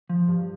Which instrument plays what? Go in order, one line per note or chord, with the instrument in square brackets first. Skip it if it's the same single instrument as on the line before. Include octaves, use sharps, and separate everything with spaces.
[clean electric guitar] F3
G2